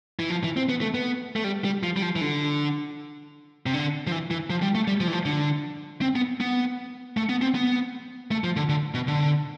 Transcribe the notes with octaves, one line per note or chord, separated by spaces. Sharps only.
E3
F3
E3
C4
B3
A3
B3
A3
G3
G3
F3
G3
F3
E3
D3
C3
D3
F3
E3
E3
F3
G3
A3
G3
F3
E3
F3
D3
C4
B3
B3
A3
B3
C4
B3
A3
F3
D3
D3
B2
D3